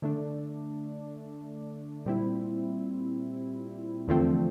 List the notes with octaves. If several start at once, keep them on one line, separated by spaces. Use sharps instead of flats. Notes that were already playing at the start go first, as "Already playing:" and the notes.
D3 A3 D4
A#2 G3 C4 E4
E2 D3 F3 A3 C4